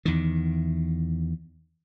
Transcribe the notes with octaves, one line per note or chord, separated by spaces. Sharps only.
E2 D#3